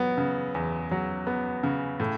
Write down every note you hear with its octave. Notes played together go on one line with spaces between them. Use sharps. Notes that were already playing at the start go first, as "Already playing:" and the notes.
Already playing: F#3 B3
C#3
E2
F#3
B3
C#3
A2